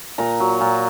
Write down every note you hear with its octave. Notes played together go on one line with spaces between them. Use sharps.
A#2 A#5
F#3
A#2